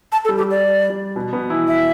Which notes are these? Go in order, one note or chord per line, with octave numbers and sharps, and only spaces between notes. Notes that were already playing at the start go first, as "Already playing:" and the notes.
A5
A4
G3
G4
D5
G3
B2 B3
B2 B3
E3 E4
E5